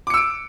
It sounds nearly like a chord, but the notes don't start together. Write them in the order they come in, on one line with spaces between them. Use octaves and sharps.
D6 C#7 E6 D7